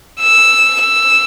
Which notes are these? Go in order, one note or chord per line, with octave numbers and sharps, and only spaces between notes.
E6
E6